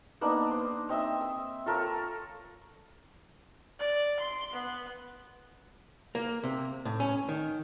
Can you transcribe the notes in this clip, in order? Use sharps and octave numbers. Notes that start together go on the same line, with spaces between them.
A#3 B3 D4 D#4
C5
C4 D#5 E5 E6
E6
F4 A4 A#4 C#5
D5
C6
B3
A#3
C3
A2
C#4
D#3